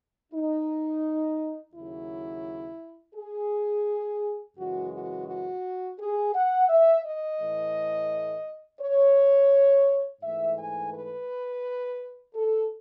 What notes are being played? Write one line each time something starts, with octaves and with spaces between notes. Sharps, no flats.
D#4
D#2 C#3 F#3 E4
G#4
F#2 C#3 E3 G#3 F#4
F#4
F#4
G#4
F#5
E5
D#5
A2 E3 A3
C#5
G#2 E3 A3 E5
G#5
B4
A4